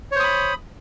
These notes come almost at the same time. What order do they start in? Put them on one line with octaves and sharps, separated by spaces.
C#5 C5 D#6 B5